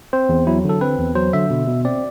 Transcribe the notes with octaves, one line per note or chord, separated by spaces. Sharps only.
C4 C5
E2
F#3 E4
D3
A4
C4 B4
E2
F#3 C5
D3 E5
B2
B2
C4 D5